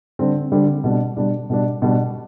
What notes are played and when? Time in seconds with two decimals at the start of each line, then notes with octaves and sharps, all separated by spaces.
0.19 D3 G3 C4
0.52 D3 G3 C4
0.84 B2 G3 D4
1.17 B2 G3 D4
1.50 B2 G3 D4
1.82 B2 G3 D4